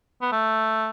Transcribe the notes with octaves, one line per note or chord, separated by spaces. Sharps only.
B3
A3